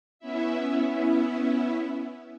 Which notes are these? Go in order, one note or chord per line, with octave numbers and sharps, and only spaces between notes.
B3 C#4 E4 E5